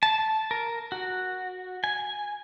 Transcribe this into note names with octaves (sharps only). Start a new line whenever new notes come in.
A5
A#4
F#4
G#5